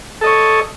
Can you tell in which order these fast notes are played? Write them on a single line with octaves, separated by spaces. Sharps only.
A4 D#5 C#5